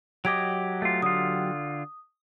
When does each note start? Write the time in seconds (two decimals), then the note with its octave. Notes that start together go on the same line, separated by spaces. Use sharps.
0.25 F#3 G4 D#5 D6 G#6 D7
0.82 A3 F4
1.02 D3 F4 D#6